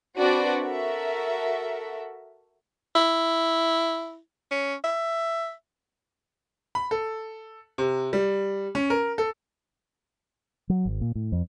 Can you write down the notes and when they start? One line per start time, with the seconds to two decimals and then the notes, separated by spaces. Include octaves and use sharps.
0.16 C4 D4 F#4 B4 D5
0.62 F#4 A4 A#4 E5
2.95 E4
4.51 C#4
4.84 E5
6.75 B5
6.91 A4
7.78 C3
8.13 G3
8.75 C#4
8.90 A#4
9.18 A4
10.69 F#3
10.85 G#1
11.01 A#2
11.15 A2
11.32 F2